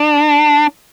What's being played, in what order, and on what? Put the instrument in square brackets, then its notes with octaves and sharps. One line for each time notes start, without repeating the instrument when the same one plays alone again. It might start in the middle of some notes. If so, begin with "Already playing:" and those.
Already playing: [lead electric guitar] D4